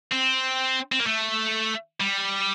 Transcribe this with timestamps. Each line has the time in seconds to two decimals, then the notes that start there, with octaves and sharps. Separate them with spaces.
0.12 C4
0.92 C4
0.99 A#3
1.06 A3
2.01 G3